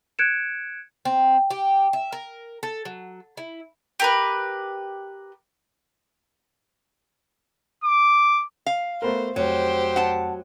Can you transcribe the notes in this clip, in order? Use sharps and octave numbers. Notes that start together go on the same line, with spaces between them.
F#6 G#6 C#7 D7 E7
C4
G4
E5
A#4
A4
F#3
E4
G4 A#4 B4
D6
F5
A3 B3 A#4 C5
F1 F#3 G4 C5
F#5 A5